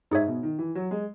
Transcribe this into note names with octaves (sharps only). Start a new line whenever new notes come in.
G#2 D#4 G#4 C#5 E5
B2
D#3
E3
F#3
G#3